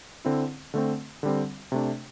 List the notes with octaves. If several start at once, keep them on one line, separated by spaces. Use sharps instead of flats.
D3 C4 E4
D3 A3 C4
D3 G3 C4
C3 A3 D4